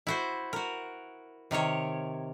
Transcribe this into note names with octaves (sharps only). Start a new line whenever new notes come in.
E4 F#4 C5
F#4 A#4
C3 D#3 A#4 C#5